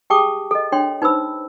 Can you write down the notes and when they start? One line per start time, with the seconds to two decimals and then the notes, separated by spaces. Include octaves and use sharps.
0.10 G4 G#4 G5 A5 D6 D#6
0.51 A4 D#5
0.72 D4 C#5 G5 C6
1.02 D#4 B4 C5 B5 E6